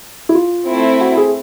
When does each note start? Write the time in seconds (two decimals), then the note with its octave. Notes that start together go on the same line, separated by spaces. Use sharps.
0.29 E4
0.35 F4
0.67 A3 C4 E4
1.01 F#4
1.17 G#4